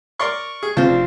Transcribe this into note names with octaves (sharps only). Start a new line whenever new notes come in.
A#4 D5 C6 C#6
G#4
D2 C#3 C4 F4 C5 A5
F1 D4